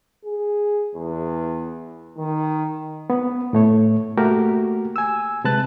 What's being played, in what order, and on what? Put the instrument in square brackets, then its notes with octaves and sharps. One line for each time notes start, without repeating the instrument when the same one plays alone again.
[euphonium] G#4
E2
D#3
[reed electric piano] B3
A2 A3 C#5
A3 A#3 F#4 G4 A#4
G#5 E6
C3 G#3 B4 A5 F#6